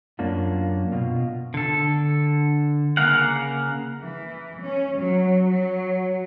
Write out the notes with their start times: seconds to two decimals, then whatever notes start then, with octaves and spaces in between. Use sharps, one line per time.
0.19 F#2 A#3 C#4 D4 F4
0.92 B2 F4
1.54 D3 A4
2.97 C#3 A#3 A#4 F5 F#5
4.01 E3
4.65 C#4
4.97 F#3
5.50 F#3